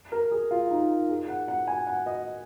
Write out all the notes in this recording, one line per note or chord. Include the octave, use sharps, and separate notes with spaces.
A#4
G#4
F4
D#4
G#4
F#5
F#5
G#5
F#5
D#5